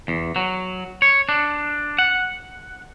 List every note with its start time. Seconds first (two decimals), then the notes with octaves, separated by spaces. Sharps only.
0.08 E2
0.36 F#3
1.02 C#5
1.29 D4
1.99 F#5